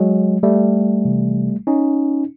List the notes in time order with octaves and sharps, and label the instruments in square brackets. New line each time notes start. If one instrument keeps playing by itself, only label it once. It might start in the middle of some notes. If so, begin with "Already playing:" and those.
Already playing: [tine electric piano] F#3 G#3
G3 A3
C3 E3
C#4 D#4